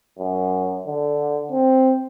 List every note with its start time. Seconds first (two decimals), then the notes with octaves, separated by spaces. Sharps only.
0.19 F#2
0.87 D3
1.51 C4